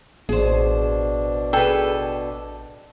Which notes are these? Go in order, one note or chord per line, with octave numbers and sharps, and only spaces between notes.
A1 B2 D4 G#4 C5
G#4 A4 B4 G5